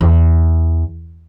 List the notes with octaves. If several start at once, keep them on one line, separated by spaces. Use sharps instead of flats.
E2